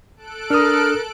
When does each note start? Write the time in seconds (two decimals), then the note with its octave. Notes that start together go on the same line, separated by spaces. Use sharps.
0.17 A4 F#6 D7
0.50 D4 A#4 D#6 F6